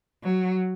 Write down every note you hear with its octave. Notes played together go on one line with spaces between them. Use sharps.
F#3